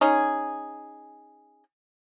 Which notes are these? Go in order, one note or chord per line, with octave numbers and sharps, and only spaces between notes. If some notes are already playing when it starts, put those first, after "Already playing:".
C#4 D#4 G#4